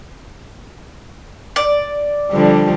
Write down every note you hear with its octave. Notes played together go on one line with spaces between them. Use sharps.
D5
D3 F3 G3